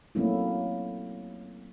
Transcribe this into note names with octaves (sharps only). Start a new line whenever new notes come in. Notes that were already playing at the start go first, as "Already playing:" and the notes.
F#3 A3 A#3 C4 C#4 E4